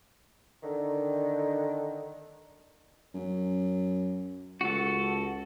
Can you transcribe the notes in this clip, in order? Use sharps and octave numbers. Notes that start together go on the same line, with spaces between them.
D3 D#3
F#2
C#2 F#4 A4